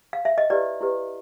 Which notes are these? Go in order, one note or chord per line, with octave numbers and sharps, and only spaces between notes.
F5
E5
D#5
E4 G4 B4 D5
E4 G4 B4